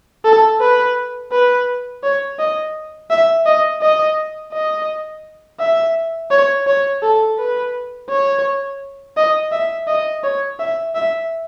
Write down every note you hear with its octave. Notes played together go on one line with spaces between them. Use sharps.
A4
B4
B4
C#5
D#5
E5
D#5
D#5
D#5
E5
C#5
C#5
A4
B4
C#5
D#5
E5
D#5
C#5
E5
E5